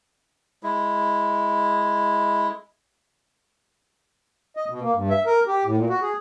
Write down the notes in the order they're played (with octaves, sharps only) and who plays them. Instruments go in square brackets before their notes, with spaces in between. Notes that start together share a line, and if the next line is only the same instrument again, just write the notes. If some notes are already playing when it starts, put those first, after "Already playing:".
[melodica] G#3 E4
[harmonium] D#5
B2
A#3
G2
E5
A#4
G4
A2
A#2
F#4
G#4